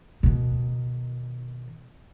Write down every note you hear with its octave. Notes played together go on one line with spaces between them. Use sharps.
B2 D#3